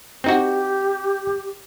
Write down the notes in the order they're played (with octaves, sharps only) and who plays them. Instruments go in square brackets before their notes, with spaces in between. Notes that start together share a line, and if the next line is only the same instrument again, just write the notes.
[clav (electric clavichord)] C4 D#4 F#4 [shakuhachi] G4